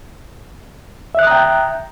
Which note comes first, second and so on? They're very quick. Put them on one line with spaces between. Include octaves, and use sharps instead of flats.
E5 F#6 D#6 A#5 G5